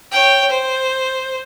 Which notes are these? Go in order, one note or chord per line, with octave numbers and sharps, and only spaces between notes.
C#5 G5
C5